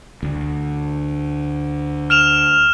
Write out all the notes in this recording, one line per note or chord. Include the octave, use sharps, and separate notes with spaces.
D2
F6 E7 F7